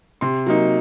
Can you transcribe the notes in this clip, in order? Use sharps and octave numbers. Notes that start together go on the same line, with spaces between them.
C3 C6
F#3 A#3 D#4